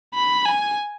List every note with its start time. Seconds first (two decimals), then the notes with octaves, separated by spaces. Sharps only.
0.14 B5
0.45 G#5